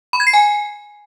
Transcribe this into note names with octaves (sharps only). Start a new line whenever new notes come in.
B5
G#6
C7
G#5